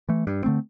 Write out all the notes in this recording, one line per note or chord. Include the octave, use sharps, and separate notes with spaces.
E3 A3
G2
D3 A3 C4